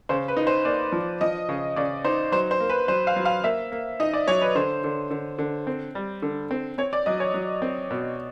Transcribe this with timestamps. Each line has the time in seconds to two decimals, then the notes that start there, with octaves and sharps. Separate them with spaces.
0.09 C#3 C5
0.28 B4
0.37 D#4
0.47 C5
0.65 A#3 D5
0.92 F3
1.21 F3 D#5
1.49 C#3
1.76 C#3 D5
2.05 D#4 C5
2.32 F#3 C5
2.51 C5
2.60 A#3
2.69 B4
2.88 F#3 C5
3.07 F5
3.16 F#3
3.25 F5
3.44 A#3 E5
3.72 A#3
4.00 D#4 D#5
4.13 D5
4.28 F#3 C#5
4.41 B4
4.55 D3 C5
4.84 D3
5.11 D3
5.38 D3
5.67 C4
5.95 G3
6.22 D3
6.51 C4
6.78 C4 C#5
6.93 D5
7.06 F#3 D#5
7.20 C#5
7.34 F#3
7.62 C4
7.91 B2